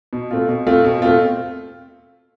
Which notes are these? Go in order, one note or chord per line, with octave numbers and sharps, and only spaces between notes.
B2
A3 C4 F4
B2
A3 C4 F4
B2
A3 C4 F4